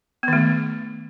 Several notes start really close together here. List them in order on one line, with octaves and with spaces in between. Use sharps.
B3 D#3 A3